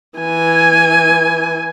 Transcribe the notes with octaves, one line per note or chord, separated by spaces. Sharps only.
E3 G#5